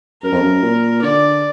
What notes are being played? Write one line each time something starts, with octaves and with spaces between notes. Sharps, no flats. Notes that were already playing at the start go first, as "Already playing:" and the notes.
F#2 A#4
F2
F#2
A#2
D3 D5